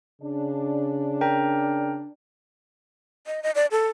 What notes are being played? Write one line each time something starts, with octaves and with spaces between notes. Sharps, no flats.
C#3 D4
A#4 G5 A#5
D#5
D#5
D5
A4